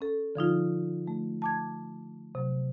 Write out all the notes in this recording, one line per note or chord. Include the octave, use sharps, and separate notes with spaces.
C#4 A4
D3 F3 D#4 F4
A3
A5 D6 G#6
C3 F#3